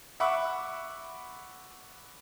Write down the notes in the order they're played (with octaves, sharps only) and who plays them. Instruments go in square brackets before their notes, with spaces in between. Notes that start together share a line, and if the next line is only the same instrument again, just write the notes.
[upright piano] E5 F#5 B5 C#6 D6 E6